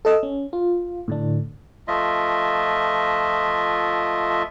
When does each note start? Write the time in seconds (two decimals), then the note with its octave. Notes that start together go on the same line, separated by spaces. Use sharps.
0.05 A4 D#5 E6
0.23 C#4
0.53 F4
1.08 A2 D3 D4
1.88 F3 A3 F4 D#5 E5